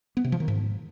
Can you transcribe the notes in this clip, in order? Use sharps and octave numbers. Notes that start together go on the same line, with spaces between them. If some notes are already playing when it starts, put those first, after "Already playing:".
B3
C3
F3
D#3
G#2